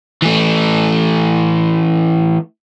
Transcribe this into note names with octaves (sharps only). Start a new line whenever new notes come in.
E3 A3